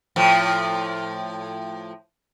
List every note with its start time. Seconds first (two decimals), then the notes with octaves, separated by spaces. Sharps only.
0.16 A2 F3